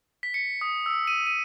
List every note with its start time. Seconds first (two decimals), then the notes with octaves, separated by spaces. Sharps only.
0.23 B6
0.34 C#7
0.61 D#6
0.86 E6
1.07 D#7
1.27 D#7